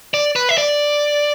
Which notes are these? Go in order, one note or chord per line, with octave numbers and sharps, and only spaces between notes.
D5
B4
E5
D5